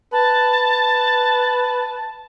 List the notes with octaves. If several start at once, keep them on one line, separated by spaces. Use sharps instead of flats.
B4 A5